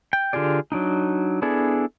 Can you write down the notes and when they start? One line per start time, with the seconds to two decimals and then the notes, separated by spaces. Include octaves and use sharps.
0.13 G5
0.33 D3 F4 G4 G#4 D5
0.72 F#3 D4 D#4
1.42 B3 D4 E4 G#4 A4